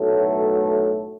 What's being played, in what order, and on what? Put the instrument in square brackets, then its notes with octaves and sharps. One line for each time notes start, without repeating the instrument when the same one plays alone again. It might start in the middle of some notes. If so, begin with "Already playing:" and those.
Already playing: [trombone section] B1 A2 F#3 A3